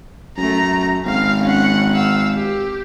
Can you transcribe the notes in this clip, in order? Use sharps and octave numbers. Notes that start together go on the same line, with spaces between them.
F#2 A3 A#5
G#1 F5 F6
C#4 F#5
F5 E6
G4